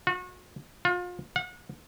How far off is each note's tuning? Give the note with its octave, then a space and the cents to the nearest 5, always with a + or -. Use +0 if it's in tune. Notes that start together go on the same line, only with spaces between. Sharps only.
F#4 -35
F4 +35
F#5 -35